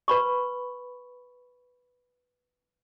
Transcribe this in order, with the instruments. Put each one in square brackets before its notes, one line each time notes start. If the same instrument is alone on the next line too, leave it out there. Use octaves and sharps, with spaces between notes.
[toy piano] B4 B5 C#6